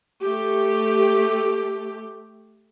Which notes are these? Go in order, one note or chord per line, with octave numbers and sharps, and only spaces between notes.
A3 G4